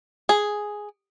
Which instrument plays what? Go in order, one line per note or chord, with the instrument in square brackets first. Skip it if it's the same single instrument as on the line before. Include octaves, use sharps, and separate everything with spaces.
[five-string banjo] G#4